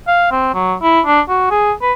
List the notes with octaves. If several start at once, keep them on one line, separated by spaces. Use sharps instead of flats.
F5
C4
F#3
E4
D4
F#4
G#4
B4